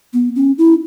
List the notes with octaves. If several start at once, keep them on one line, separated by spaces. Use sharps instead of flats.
B3
C#4
E4